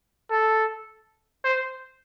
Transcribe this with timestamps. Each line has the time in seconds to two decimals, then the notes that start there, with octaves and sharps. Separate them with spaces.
0.30 A4
1.44 C5